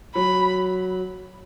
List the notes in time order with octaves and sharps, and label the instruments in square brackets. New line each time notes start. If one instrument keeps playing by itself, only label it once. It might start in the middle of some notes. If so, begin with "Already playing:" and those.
[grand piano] F#3 [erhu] B5